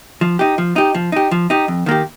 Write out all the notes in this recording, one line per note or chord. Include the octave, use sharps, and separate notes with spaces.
F3
D#4 G4
F3
D#4 G4
F3
D#4 G4
F3
D#4 G4
F2
D#3 A#3 G4